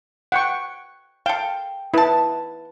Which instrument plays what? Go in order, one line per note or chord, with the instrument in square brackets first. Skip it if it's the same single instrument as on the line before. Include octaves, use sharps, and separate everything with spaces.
[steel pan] F#5 G5 C#6
[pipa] A4 G5 [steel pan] F5
[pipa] D#4 A5 [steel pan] E4 B4